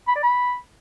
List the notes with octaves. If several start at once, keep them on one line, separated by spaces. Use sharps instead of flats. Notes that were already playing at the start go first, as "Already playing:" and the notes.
B5
D5
B5